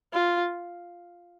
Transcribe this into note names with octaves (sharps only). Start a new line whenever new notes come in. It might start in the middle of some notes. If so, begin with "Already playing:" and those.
F4